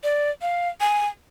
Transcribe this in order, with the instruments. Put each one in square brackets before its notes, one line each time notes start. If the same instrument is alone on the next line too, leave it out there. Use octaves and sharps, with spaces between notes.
[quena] D5
F5
G#5